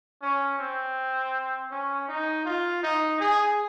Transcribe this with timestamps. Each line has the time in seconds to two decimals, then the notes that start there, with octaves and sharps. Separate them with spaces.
0.22 C#4
0.59 C4
1.71 C#4
2.08 D#4
2.45 F4
2.83 D#4
3.20 G#4